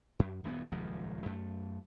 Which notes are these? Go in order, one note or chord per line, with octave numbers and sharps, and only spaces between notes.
F#2
D#1 F#2 A#3 B3
D#1 C#2 F#2 F3
F#2 A3